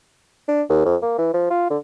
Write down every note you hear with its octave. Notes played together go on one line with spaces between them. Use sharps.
D4
D#2
F2
A#3
E3
F3
F4
D3